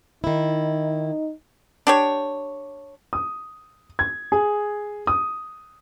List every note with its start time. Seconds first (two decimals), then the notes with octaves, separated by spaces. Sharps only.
0.24 D#3 D#4 E4
1.87 D4 G4 C#5
3.13 D#6
3.99 G#6
4.32 G#4
5.07 D#6